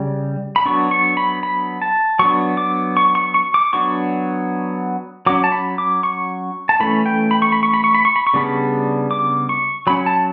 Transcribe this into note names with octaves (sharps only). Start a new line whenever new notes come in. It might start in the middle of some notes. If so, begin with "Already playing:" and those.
Already playing: C#3 G3
B5
F#3 B3 D4 C#6
C#6
B5
B5
A5
F#3 B3 D4 C#6
D6
C#6
C#6
C#6
D6
F#3 B3 D4 C#6
F#3 C#4 D6
A5
B5
D6
C#6
A5
E3 A3 C#4 B5
G5
B5
C#6
B5
C#6
B5
C#6
B5
C#6
B5
C#6
C#3 G3 B3 D4 B5
D6
C#6
F#3 C#4 B5
A5